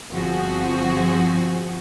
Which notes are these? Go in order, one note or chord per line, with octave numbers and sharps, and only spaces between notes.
G1 F3 C4 F#4 G#4